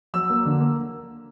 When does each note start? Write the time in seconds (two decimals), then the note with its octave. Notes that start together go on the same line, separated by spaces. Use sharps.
0.14 F#3 E6
0.30 A#3
0.46 D3
0.60 A#3